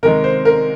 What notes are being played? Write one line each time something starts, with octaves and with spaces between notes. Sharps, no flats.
C3 D#3 G#3 A#4
C5
A#4